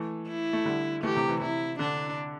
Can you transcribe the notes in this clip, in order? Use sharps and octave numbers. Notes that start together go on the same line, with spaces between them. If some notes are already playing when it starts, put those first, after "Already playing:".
Already playing: E3 A3
E4
A3
D3 G3
E3 A3 G4
C3 E3
C3 E3
C3 E4
D3 D4